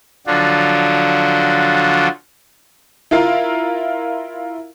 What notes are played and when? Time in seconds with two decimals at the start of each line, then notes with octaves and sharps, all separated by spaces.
0.27 D3 F3 F#3 D4 F4 F#4
3.11 E4 F4 A#4 F5